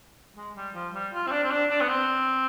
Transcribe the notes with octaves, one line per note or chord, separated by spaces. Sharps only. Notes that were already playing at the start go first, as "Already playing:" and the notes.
G#3
G3
F3
G3
F4
C4
D4
C4
D4
D4
B3
C4